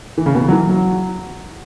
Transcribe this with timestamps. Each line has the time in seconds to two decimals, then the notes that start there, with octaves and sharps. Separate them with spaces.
0.18 E3
0.26 C#3
0.35 B2
0.43 C#3
0.48 F#3
0.52 E3
0.69 F#3